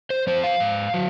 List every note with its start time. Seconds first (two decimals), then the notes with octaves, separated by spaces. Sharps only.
0.10 C5
0.27 F3 C4 C5
0.44 F5
0.60 G#2
0.94 F#3